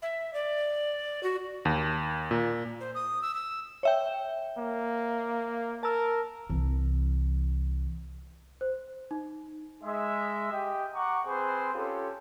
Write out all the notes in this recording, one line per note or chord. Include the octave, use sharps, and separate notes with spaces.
E5
D5
F#4
D#2
A#2
C5
D#6
E6
E6
C#5 E5 G5
A#3
A#4 A5 E6
C2 E3
C5
D#4
G#3 E5
G4 D#5 G5
F#5 A#5 C#6 D6
C4 G#4 B4 C5
C#4 F4 G4 A4